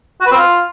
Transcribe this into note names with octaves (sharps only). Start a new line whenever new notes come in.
F#4
B4
C4
F4